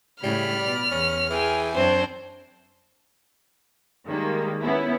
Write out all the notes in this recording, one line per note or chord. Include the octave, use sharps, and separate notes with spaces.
A2 C#3 G3 B5 F6
B2 D5
E2 C#4
E3 G#4 G5 G#5
F#2 C4 D4 C5 C#5
D#3 G3 G#3 A#3
B3 C#4 E4